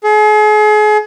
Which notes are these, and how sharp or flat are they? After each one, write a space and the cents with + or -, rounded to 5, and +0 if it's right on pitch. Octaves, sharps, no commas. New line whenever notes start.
G#4 +35